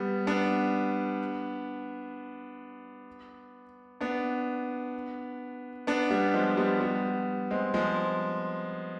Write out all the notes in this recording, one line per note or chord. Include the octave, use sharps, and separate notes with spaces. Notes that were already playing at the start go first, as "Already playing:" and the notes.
Already playing: G3 B3
B3 D4
B3 D4
B3 D4
G3 B3
F3 G#3
G3 B3
G3 B3
G#3 C4
F3 G#3